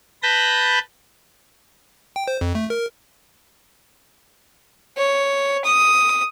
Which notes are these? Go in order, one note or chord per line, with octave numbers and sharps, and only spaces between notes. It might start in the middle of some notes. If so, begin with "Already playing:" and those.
B4 A5 B5 G6 A#6
G5
C5
F2
A3
A#4
C#5
D#6